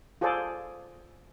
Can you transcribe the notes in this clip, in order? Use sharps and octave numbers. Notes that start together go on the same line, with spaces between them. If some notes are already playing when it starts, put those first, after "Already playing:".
F4 G#4 A4 C5 D5